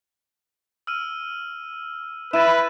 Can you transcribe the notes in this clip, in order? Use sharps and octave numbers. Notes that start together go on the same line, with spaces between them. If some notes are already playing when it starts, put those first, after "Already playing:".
E6 F6 D#7
E4 B4 A6 D#7 E7